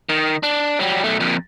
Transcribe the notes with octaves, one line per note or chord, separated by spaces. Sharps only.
D#3
D4
F#3 G3
B1 A3
F2 A#2